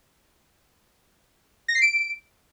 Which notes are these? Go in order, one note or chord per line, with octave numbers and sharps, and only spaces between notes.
A#6
C7
D7